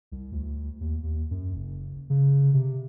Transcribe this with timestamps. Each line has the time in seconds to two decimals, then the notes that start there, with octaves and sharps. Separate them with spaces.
0.12 C2
0.32 D2
0.81 D#2
1.04 D#2
1.31 F#2
1.55 F#1
2.10 C#3
2.54 C3